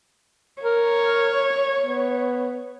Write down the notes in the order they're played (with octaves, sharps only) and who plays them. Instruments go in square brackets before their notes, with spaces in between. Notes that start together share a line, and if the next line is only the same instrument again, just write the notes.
[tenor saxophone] A#4 [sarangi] C#5
[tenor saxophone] B3